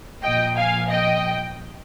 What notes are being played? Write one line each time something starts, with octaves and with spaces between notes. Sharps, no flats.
A#2 F3 D#5 G5
F5 G#5
D#5 G5